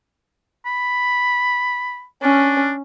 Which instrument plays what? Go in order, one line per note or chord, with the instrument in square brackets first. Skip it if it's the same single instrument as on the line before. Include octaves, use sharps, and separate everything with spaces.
[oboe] B5
[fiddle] C#4 [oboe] D4